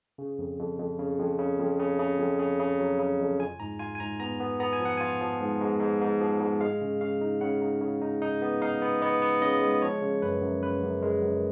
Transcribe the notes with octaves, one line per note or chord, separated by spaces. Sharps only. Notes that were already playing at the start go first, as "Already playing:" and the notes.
C#3
F2
F2
F2
C#3
F2
C#3
F2
C#3
C#3
F2
C#3
C#3
F#3
C#3
F2
F4 G#5
G#2 A#5
F4 G#5
G#5
G#2 A#5
B3 A#5
B3
B3 A#5
G#5
F3
F#5
F4 G#5
F3
G#2
G#2
G#2
G#2
F3
G#2
G#3 F5
C#3
C#3 F5
D#4
C#3 F#5
D#4
C#3
D#4
D#4
B3
D#4 F5
B3
B3 D#5
B3
C#3 D#5
G#3
F3 C#5
C#3
F#2 B4
F#2
C#3 B4
F#2
G#3 A#4
F#2